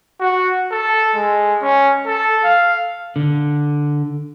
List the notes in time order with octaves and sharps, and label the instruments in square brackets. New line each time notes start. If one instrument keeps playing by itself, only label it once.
[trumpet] F#4
A4
G#3
C#4
A4
F5
[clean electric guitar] D3